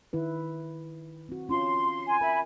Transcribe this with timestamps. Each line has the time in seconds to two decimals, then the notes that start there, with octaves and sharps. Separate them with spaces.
0.13 D#3 E4 B4
1.29 C4 F#4
1.49 C#4 F4 C6
2.07 G#5
2.21 A#4 E5 B5